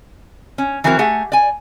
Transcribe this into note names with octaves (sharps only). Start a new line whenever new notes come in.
C#4
E3 F#3 C4 F#4 A#4
A3 G4 G#4 F#5
D5 G#5